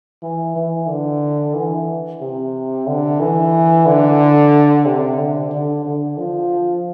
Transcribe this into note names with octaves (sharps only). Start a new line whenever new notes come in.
E3
E3
D3
E3
C3
D3
E3
D3
C3
D3
D3
D3
F3